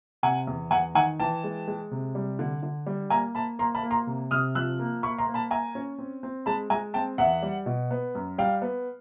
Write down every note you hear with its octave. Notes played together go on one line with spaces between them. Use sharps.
C3 F#5 G#5
E2
E2 F#5 G#5
D#3 F#5 G#5
E3 G5 A5
G#3
G#3
C3
G3
D3
D3
G3
A#3 G#5 A#5
A#3 A5 B5
A#3 A#5 C6
A5 B5
A#3
A#5 C6
C3
C3 D#6 F6
F3 E6 F#6
A#3
A#3 B5 C#6
A#5 C6
A#3
A5 B5
A#3 G#5 A#5
C#4
C4
C4
G#3 A5 B5
G#3 G#5 A#5
C4 G5 A5
E2 E5 F#5
G3
B2
B3
F#2
G3 F5 G5
B3